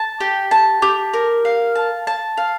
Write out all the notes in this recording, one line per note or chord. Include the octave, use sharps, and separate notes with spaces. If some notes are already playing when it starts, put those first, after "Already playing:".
Already playing: A5
G4
A5
G4
A#4
F5
A5
A5
F5